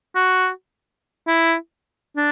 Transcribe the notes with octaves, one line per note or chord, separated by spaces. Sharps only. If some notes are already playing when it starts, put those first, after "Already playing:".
F#4
E4
D4